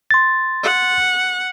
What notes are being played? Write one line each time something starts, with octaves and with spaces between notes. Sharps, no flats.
C6 A6
F#5